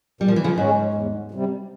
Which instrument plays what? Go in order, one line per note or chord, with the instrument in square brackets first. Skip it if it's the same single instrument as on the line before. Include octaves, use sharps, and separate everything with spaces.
[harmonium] A#2 [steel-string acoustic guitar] G3
[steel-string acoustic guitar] F3
E3
C#3 F3
[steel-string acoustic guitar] G#2 [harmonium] G#3 C#4
[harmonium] E2
C3 G3